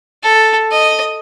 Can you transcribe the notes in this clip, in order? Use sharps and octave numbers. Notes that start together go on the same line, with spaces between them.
A4
D#5